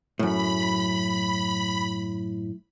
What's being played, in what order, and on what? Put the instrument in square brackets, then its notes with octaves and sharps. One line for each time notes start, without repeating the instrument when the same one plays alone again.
[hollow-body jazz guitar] F#2 A2 [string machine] B5